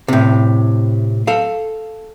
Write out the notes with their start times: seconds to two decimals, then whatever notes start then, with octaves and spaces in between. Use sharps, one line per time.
0.08 A2 C3
1.27 A4 F5